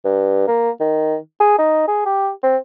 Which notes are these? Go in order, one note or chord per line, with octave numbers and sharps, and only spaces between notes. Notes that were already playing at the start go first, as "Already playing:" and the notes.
G2
A#3
D#3
G#4
D#4
G#4
G4
C4